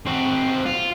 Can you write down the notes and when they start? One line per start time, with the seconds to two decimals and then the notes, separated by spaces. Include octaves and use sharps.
0.06 C4 F#4
0.66 F4